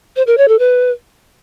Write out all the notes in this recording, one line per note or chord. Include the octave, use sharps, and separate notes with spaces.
C5
A#4
C#5
A4
B4